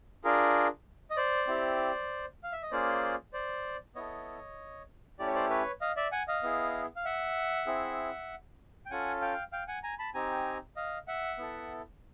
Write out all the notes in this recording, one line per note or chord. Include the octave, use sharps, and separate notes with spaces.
D4 F4 G#4 A#4
D#5
C5 D5
C4 E4 G4
F5
E5
D#5
A#3 C#4 F4 G#4 C5 D5
C5 D5
B3 E4 A4 C#5 D#5
A3 C#4 E4 G4 D5
C#5
C5 D5
B4 C#5
D#5 F5
D5 E5
F#5 G#5
D#5 F5
B3 E4 G#4
F5
E5 F#5
C4 E4 G#4
G5
C#4 F4 A4 F#5 G#5
F5 G5
F5 G5
F#5 G#5
G#5 A#5
A5 B5
C4 D#4 G4 G#5 A#5
D#5 F5
E5 F#5
B3 E4 A4